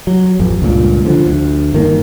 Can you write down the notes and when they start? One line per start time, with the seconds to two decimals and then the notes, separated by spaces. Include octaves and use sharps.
0.07 F#3
0.39 A1 F2
0.62 C#2 G2 A#2
1.05 D3 F3
1.26 D2
1.72 G1 E2 D#3 A#3